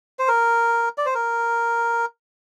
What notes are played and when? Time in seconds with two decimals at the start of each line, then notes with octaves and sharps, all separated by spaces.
0.19 C5
0.28 A#4
0.98 D5
1.06 C5
1.15 A#4